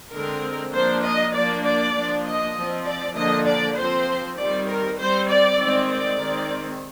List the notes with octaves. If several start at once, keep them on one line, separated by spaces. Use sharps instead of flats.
D3 G#3 C4 A#4
F3 A#3 D4 C5
D#5
F3 A#3 D4 D5
D5
F3 A#3 D4
D#5
F3 C4
D5
D3 F3 A#3 D4 D#5
D5
F3 C4 C5
D#3 G3 C4 D5
A#4
G3 C4 C5
D5
D#3 G#3 C4
D5
D#3 G#3 C4